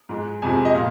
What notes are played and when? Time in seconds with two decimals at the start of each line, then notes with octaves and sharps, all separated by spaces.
0.09 G#2 G#3
0.42 F2 C3 F3 G#3 G#5
0.65 D#5
0.74 A#2 F5